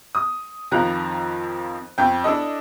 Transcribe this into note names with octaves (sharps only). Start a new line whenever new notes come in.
D#6
F2 D#3 F3 F4 A#5 F#6
F2 G5
D4 E4 A4 D#5